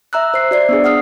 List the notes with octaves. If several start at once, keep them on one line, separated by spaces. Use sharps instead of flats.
E5 A#5 E6 F#6
C5 C7
F#4 D5 C7
B3 D4 G#4
F#5 D#6 F6 C7